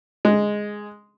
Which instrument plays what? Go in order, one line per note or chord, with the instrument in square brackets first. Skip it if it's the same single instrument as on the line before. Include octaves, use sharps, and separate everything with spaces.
[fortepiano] G#3